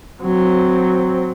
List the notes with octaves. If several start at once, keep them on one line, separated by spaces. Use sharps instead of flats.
F#3 C4